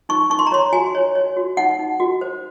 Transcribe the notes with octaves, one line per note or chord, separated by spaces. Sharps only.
D#4 C#6
D#4 C#6
C6
A#5
C#5 C6
F#4 G#5
C#5
C#5
F#4
D#4 F#5
D#4
F#4
C5